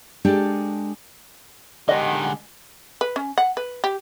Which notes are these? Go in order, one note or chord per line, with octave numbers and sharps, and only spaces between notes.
G#3 D4 G4 A4
D3 D#3 G#3 G4 D#5 F#5
B4
C#4
F#5
B4
G4